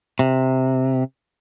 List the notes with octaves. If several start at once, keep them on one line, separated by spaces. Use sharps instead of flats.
C3